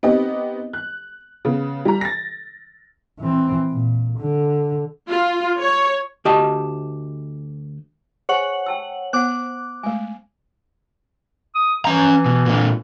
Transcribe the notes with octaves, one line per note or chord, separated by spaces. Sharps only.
B3 C4 D#4 G4 D#5
F#6
C#3 B3
G3 A#5
A6 A#6
E3 C4
A#2
D3
F4
C#5
D2 G4 D#5 G5 A5
G#4 C5 C#5 F#5 G#5 F#7
G5 A5 E6
B3 C5 F#5 D6 F#6
G#3 A3 G#5
D#6
E3 C#4 A#5
B2
A#2 D3